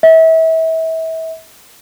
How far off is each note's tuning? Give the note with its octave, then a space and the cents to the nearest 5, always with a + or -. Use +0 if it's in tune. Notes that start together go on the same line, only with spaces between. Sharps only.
E5 -30